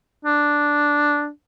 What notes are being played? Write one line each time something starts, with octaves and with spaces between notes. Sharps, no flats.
D4